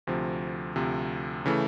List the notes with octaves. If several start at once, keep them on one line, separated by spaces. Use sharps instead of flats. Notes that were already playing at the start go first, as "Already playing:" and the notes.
D2 C3 F3
D2 C3 F3
C#3 E3 A3